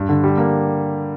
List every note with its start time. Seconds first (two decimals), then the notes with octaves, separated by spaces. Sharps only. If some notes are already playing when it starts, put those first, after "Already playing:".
Already playing: G2
0.09 D3
0.24 G3
0.37 A#3